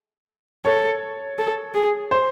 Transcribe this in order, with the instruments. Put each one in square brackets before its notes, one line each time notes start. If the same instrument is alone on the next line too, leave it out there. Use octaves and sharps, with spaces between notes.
[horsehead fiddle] A4 [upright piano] C#5
[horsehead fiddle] A4
G#4
[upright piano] C5